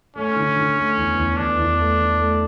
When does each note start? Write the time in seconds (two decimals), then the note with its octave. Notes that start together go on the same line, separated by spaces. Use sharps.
0.16 A3 C#4
0.36 D3
0.56 D3
0.77 A3
0.97 E2
1.17 E2
1.36 E2 D4
1.57 E2
1.77 A3
1.98 E2
2.18 A3